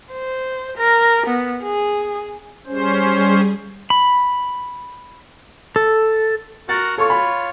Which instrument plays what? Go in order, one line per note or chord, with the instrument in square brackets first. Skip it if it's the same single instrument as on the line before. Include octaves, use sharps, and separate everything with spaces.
[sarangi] C5
A#4
B3
G#4
[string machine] G3 G#4 [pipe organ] C#4 C5
[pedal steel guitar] B5
A4
[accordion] F#4 A#4 F#5 [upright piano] A6
[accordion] F4 C#5 [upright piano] A4 C#6
[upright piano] B5